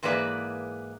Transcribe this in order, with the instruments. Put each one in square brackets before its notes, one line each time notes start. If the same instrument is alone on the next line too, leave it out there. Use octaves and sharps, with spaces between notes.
[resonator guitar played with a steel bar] G#2 E3 A#3 G#4 B4 D5